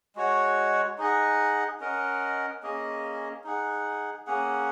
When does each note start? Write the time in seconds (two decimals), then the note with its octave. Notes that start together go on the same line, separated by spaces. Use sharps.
0.16 G#3 F#4 C#5 F#5
0.98 D#4 G#4 D#5 F#5
1.80 C#4 A#4 D#5 F#5
2.63 A#3 C#4 G#4 D#5
3.44 D#4 G#4 F#5
4.27 A#3 C#4 G#4 F#5